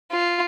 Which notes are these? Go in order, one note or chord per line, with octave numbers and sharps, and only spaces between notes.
F4